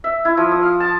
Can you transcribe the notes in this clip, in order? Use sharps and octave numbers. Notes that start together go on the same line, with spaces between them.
E5
E4
F3
D#6
F5
A5